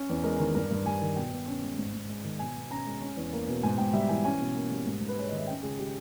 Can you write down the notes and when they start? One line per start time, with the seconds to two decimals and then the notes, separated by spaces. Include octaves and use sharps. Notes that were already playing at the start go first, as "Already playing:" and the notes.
Already playing: C#4
0.09 E2
0.24 G#3 A#4
0.39 D#3
0.55 G2 A#4
0.71 G2
0.86 G3 G#5
1.01 D#3
1.16 B2 G5
1.32 B2
1.47 C#4
1.62 G#3
1.78 G#2
1.93 G#2
2.08 G#3
2.24 D#3
2.39 B2 G#5
2.56 B2
2.70 C#4 A#5
2.86 G#3
3.01 C#4
3.17 E2
3.33 A#3
3.48 B2
3.63 G#2 G#5
3.78 G#2 G5
3.93 G3 E5
4.09 E3 G#5
4.24 C#4 G#5
4.40 B2
4.56 A#3
4.71 G3
4.86 G#2
5.01 G#2
5.09 B4
5.16 G#3 C#5
5.28 D#3 D#5
5.38 E5
5.47 C#4 G5
5.63 C#2 G#4
5.79 G#3 G4